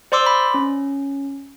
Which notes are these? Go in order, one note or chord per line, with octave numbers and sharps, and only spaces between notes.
C5 D5 C6 D6 E6
B5
C#4